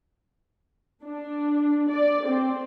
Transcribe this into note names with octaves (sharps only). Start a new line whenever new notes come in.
D4
D5
C4